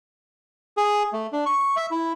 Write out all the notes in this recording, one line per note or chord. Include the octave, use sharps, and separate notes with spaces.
G#4
A3
D4
C#6
E5
E4